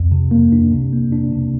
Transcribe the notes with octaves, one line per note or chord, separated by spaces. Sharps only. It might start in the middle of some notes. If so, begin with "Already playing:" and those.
Already playing: F2
C3
A#3
D4
C3
A#3
D4
C3